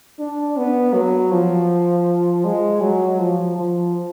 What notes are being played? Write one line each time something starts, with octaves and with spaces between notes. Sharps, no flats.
D4
B3
F#3
F3
G#3
F#3
F3
F3